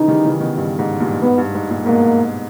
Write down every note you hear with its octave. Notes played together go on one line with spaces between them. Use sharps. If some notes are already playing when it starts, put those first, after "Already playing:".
Already playing: C#3 E3 D#4
D#3 G3
C#3 E3
B2 D#3
G2
G#2
G2 A#2
G#2 B3
G2
G#2
G2 A#2
G#2 B2 A#3